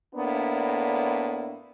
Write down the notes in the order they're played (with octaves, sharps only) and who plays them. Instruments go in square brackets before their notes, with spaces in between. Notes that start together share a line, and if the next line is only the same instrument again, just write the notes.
[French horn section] A2 A#3 B3 D4